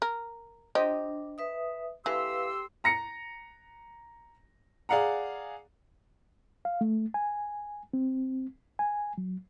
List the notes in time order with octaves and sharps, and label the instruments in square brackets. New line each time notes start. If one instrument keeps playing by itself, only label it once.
[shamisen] A#4
[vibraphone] D4 [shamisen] G4 [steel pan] C5 D#5
[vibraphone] B4 E5 D#6
[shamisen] E3 [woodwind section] G4 C6 E6 [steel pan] A4 [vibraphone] B4 F5
[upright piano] A#5 A#6 C#7
G#4 D5 F5 F#5 A#5
[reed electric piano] F5
A3
G#5
C4
G#5
F#3